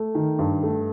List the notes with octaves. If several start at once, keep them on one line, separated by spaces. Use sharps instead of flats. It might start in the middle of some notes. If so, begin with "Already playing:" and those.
Already playing: A3
D#3
G2
A3